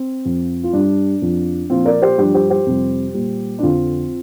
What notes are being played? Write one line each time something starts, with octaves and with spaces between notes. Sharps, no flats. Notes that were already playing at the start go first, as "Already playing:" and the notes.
Already playing: C4
F2 F3
F4
G2 D4
G3
F2 F3
A#2 F3 C4 F4
A#4 D5
G4 C5
G2 F3 D4 G4
G4 C5
G4 C5
F2 C3 G3
A#2 G3
D4
F2 D3 F3 C4 F4